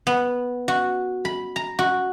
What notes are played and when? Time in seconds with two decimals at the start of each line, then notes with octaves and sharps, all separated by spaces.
0.07 B3
0.68 F#4
1.25 B5
1.56 A#5
1.79 F#4